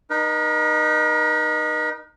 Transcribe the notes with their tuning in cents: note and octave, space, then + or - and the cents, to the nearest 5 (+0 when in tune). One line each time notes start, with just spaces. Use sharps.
D#4 -20 A#4 +45